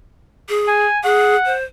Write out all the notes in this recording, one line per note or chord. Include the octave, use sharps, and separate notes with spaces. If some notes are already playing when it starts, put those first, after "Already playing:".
G#4
G#5
G#4 F#5
C5